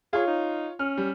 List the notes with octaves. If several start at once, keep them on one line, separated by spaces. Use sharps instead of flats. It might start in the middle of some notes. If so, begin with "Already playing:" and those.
F4 G#4 C#5
D#4
C#4 F6
G3